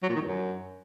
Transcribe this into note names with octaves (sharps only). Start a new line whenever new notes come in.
F#3
A#2
D#3
G2
F#2